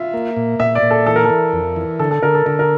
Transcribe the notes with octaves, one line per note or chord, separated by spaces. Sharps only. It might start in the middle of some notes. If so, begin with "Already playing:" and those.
Already playing: F4 E5
A#3
A#2
A#2 E5
D5
A#2
A4
E3 A4
A#4
A4
E3
F2
E3
D3 A4
A4
D3 A#4
A4
D3 A#4
A#4